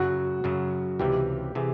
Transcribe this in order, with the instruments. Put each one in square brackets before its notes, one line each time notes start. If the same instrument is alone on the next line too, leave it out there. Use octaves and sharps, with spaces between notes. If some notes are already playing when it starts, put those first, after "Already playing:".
Already playing: [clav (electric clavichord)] F#2 C#3 F#3 [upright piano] F#4
[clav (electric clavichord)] F#2 C#3 F#3
[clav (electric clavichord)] C#2 C3 E3 [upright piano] G4
[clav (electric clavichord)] C3 E3 [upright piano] G#4